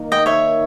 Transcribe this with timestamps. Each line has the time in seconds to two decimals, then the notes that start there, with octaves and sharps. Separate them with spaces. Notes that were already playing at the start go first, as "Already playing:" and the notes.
Already playing: D#3 A#3 D#4 A#4
0.12 D#5 G5
0.26 C#5 E5